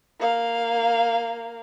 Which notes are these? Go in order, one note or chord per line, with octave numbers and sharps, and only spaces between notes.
A#3 F5